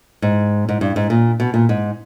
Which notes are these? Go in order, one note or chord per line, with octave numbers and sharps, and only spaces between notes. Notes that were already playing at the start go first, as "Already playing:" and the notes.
G#2
G#2
G2
G#2
A#2
B2
A#2
G#2